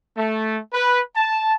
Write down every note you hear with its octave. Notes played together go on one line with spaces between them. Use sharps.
A3
B4
A5